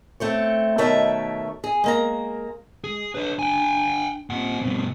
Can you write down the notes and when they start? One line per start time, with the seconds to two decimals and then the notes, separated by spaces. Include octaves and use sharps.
0.20 A3 C4 C#5
0.78 B2 D#3 A3 C#5 E5 A5
1.64 G#4
1.84 G#3 A#3 A#5
2.84 G#3 G#4
3.15 D4 B4 C#5
3.39 G5 G#5
4.30 A#2 C4 F#5
4.61 G2 B2